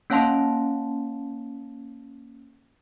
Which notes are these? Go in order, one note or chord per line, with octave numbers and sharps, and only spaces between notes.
A#3 C#4 C#5 F5 A5 C6